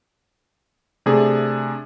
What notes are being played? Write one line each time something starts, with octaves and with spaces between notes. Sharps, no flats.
C3 A3 D4 G#4